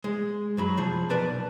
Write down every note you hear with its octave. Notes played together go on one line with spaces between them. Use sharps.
G#3
F#2 F#3 B5
C3 F3 G#4
B1 A#4 B4 D5 A5